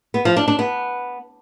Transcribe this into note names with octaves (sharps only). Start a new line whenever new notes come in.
B3
F3
D4
D4
B3